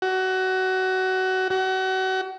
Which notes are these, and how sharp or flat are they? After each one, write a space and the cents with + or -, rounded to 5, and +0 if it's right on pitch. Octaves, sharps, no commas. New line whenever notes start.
F#4 +20
F#4 +30